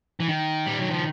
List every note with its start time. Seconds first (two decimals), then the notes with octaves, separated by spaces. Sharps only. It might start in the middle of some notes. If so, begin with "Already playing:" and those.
0.20 E3
0.28 D#3
0.66 G3
0.79 F#3
0.91 F3